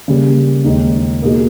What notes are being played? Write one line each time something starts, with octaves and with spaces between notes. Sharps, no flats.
C#3 G3 A#3
D#2 D#3 G#3 D#4
B2 A#3 D#4 G#4